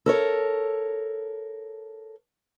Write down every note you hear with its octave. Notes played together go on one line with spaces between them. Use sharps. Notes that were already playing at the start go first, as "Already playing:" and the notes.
A4 A#4 C#5